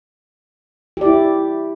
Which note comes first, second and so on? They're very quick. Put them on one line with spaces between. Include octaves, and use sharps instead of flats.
G4 D5 E4